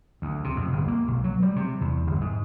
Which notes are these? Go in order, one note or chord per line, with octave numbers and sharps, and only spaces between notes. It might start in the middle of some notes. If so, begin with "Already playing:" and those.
D2
C3
F2
G1
A#3
B1
F#3
G3
C3
E2
G1
G#2